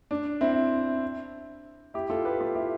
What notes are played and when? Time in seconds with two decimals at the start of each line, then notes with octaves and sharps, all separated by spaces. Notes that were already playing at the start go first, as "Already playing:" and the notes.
0.11 D4
0.41 C4 E4
1.94 E4 G4
2.10 F4 A4
2.25 G4 B4
2.41 F4 A4
2.55 E4 G4